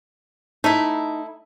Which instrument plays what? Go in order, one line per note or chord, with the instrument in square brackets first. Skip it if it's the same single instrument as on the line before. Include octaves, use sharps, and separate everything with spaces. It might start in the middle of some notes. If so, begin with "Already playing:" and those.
[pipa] A3 E4 [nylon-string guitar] D#4